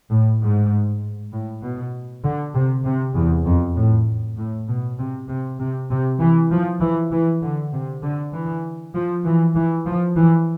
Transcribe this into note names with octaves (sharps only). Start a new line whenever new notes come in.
A2
G#2
A2
B2
D3
C3
C3
E2
F2
A2
A2
B2
C3
C3
C3
C3
E3
F3
E3
E3
D3
C3
D3
E3
F3
E3
E3
F3
E3